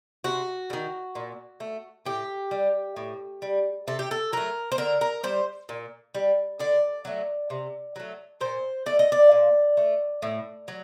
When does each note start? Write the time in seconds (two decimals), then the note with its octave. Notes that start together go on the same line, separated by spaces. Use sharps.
0.24 C3 F#4
0.70 G3
0.73 D#3
1.15 A#2
1.60 A3
2.06 A2 G4
2.51 G3
2.97 A2
3.42 G3
3.87 C3 A4
3.99 G4
4.11 A4
4.32 F#3 A3 A#4
4.72 C5
4.78 D3 A#4
5.01 A#4
5.23 G3 C5
5.69 A#2
6.15 G3
6.60 D3 D5
7.05 F#3 A3
7.50 C3
7.96 F#3 A3
8.41 A#2 C5
8.86 A3 D5
8.99 D#5
9.12 D5
9.32 A#2
9.77 A3
10.22 A2
10.68 F#3